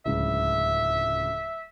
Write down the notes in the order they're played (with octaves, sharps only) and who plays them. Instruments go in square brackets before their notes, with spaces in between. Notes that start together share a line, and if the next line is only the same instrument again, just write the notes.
[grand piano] D1 C#2 C#3 [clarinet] E5